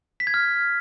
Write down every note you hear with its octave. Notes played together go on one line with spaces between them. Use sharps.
B6
G#6
F6